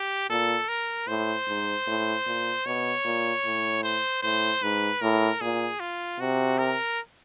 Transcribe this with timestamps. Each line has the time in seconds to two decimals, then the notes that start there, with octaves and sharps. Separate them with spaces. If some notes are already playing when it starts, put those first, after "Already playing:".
Already playing: G4
0.29 A#2 A4
0.69 A#4
1.08 A2 C5
1.47 G#2
1.87 A2
2.26 A#2
2.65 B2 C#5
3.05 A#2
3.44 A2
3.83 C5
4.23 A2 C5
4.62 G#2 B4
5.01 A2 A#4
5.41 A#2 G#4
5.80 F4
6.20 C3 F#4
6.59 A#4